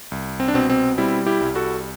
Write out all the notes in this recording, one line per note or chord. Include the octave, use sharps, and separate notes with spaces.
C2
C4
D4
B2 C4
C4
G3 C4 E4
E4 G4
C2
F#4 A4